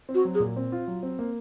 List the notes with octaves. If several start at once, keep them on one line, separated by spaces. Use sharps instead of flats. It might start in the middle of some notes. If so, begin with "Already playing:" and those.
C4
F#4
F#3
G#4
A#2
C4
F4
F#3
C4
A#3